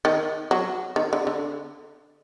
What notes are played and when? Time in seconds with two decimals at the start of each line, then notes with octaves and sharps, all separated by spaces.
0.05 D#3
0.51 F#3
0.96 D#3
1.13 D3
1.27 D3